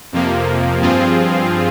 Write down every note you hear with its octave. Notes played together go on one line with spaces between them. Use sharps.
F2 C3 F3 A#3
G2 F3 C4 F4 G#4